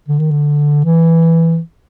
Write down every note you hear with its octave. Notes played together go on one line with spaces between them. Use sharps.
D3
D#3
D3
E3